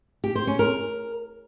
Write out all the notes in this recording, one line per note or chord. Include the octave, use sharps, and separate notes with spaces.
G4
C5
C#4
A#4